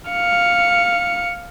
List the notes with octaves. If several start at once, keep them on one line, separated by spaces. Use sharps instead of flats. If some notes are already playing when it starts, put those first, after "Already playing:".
F5 C#7